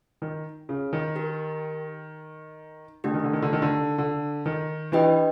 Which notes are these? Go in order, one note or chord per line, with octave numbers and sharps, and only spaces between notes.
D#3
C#3
D#3
D#4 G4 A#4
D3 A3 D4 G4
D#3
D3
D#3
D3
D#3
D3
D3
D#3
E3 D4 G4 B4 D#5 G5